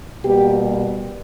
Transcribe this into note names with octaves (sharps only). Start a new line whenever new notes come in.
B2 G3 A#3 G4